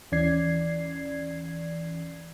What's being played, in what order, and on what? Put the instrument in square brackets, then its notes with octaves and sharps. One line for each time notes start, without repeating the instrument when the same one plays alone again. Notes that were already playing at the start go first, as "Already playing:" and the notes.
[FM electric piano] D#2 E3 C#4 D5 G#6 C7